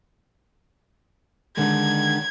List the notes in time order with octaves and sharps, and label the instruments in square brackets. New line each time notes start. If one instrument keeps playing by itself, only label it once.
[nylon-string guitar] D3 D#3 G#3 [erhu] G#6